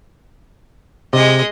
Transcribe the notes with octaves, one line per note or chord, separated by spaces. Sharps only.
C3 G#3 D#5